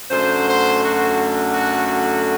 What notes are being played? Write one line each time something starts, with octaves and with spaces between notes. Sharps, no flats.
F#2 D3 A3 C5
C5
F#4
F#4
F#4